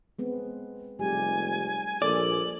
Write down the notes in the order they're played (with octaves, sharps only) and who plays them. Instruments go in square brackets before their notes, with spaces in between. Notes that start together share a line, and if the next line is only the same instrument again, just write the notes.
[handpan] G#3 B3 C4
[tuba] F1 [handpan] G3 G#3 G4 [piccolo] G#5
[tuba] A#1 [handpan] A4 [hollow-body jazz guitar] D5 [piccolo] F#7